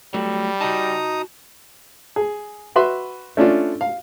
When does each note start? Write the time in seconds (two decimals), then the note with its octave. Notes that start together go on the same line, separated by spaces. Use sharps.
0.14 F#3 G3 A3
0.61 D#4 F#4 A5 A#5 D#6
2.16 G#4
2.76 F#4 B4 E5 B5 C6
3.37 A3 C#4 D4 F4
3.81 F5